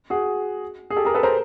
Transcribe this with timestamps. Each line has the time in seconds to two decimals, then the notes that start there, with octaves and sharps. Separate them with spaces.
0.10 F#4 G#4
0.90 G#4
0.97 G4 A4
1.05 G#4 A#4
1.14 A4 B4
1.23 A#4 C5